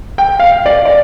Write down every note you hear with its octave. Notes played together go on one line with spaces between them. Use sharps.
G5
F5
D5
D5